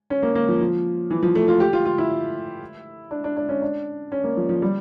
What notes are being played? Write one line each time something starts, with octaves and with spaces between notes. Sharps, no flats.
C#4
A#3
A#3
F3
F3
E3
F3
A3
F4
G4
F4
F4
E4
D4
D4
D4
C#4
D4
C#4
A#3
F3
F3
G3